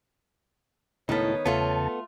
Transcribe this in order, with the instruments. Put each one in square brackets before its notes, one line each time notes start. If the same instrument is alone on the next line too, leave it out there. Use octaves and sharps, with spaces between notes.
[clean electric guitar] C#2 A2 A4 [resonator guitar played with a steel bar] D#3 B3 [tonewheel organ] E4 [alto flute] C#5
[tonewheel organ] E2 C#3 A5 [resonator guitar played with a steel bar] A3 F4 [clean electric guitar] B3 A4